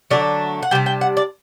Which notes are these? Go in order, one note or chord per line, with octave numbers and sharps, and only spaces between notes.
D3 F#3 A3 D4 D5
F#5
C3 G3 D4 G5
G5
F#5
D5